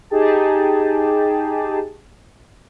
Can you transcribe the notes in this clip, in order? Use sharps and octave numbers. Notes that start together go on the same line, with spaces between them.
D#4 G4 G#4 G5 A5